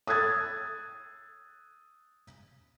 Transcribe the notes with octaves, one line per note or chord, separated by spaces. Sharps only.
D#6 E6 F#6 G#6 A6